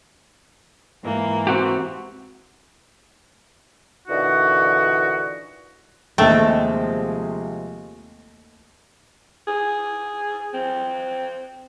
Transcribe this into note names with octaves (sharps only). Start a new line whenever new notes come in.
G#2 E3 A#3
C4 F#4 G4
A#2 D3 E3 D#4 F#4
D#2 C3 F3 G#3 A3 A4 G5
G#4
C4